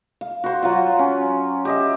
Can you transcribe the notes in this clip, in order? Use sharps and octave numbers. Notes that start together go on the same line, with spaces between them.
F5
F#4 C5
F#3 F4 F#5
C#4
G4 D#5 E5